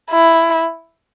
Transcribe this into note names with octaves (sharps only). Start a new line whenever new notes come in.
E4